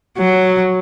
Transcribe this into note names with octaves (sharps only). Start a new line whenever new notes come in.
F#3